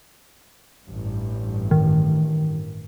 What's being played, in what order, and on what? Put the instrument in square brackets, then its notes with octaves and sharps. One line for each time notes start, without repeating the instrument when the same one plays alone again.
[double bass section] A1 G2
[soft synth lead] D#3